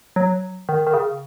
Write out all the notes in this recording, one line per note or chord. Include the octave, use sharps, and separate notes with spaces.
F#3
D#3
D#3
C#3